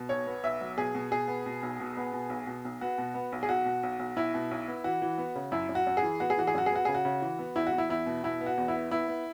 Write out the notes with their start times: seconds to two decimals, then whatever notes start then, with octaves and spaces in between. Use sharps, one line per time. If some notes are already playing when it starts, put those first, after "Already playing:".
Already playing: B2
0.09 B1 C#5
0.27 B3
0.44 B1 E5
0.61 F#3
0.77 B2 G#4
0.95 B2
1.11 B2 G#4
1.28 B3
1.46 B2
1.63 B1
1.80 B2
1.97 B3
2.13 B2
2.30 B1
2.47 B2
2.65 B1
2.81 B3 F#4
2.98 B2
3.14 B3
3.32 B1
3.43 G#4
3.49 B1 F#4
3.65 B2
3.83 B1
3.99 B1
4.16 B1 E4
4.34 B2
4.51 B1
4.68 B3
4.84 E3 F#4
5.02 E3
5.18 B3
5.35 C#3
5.52 F#2 E4
5.69 F#2
5.75 F#4
5.87 F#2
5.97 G#4
6.03 E3
6.20 B3 F#4
6.30 G#4
6.38 E3 F#4
6.47 G#4
6.54 F#2 F#4
6.66 G#4
6.71 B3 F#4
6.85 C#3 G#4
6.95 F#4
7.05 C#3
7.22 E3
7.39 B3
7.56 E2 E4
7.67 F#4
7.72 E2
7.78 E4
7.89 E2 E4
8.06 B2
8.23 B2 E4
8.41 B3
8.46 F#4
8.57 E2
8.68 E4
8.74 B3
8.91 B3 E4
9.08 B3